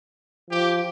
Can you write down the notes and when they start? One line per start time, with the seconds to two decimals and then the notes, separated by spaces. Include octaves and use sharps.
0.51 F3 G4